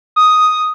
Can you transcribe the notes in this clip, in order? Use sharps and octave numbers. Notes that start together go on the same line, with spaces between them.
D#6